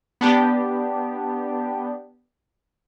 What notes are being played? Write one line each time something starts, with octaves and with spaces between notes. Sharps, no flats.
B3 D4 G4